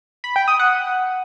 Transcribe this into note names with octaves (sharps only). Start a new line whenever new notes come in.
B5
G5
D#6
F#5